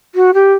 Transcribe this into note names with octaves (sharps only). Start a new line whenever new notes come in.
F#4
G4